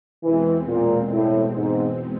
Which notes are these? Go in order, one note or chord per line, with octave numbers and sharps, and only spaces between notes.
E2 B2 E3 G#3 C4
A#2
A2
G#2